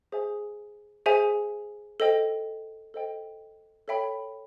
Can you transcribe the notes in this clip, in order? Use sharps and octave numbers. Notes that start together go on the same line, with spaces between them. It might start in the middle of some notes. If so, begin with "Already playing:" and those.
G#4 C5 E5 G#5
G#4 C5 E5 G#5
A4 C5 D#5 G5
A4 C5 D#5 G5
A4 C#5 E5 G5 B5